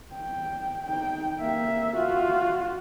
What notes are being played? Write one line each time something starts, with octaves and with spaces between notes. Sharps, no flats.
G5
D#4 G5
A#3 E5
F4 F#4